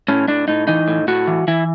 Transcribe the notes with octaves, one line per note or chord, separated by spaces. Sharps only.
A2 C#4
A2 D4
A2 D#4
E3 D#4
A2
A2 F#4
E3
E3 E4